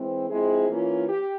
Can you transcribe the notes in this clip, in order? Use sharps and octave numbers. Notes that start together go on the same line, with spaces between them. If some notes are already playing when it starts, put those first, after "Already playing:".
Already playing: E3 G#3 C4
F3 G#3 C4 E4 G#4
E3 A#3 C#4 F4
G4